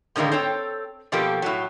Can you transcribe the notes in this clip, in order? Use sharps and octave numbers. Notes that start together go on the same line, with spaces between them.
A2 D3 D#3 G#3 A#3
C4 A4 C#5 G5
B2 F3 A#3 G4 A4
A2 F#3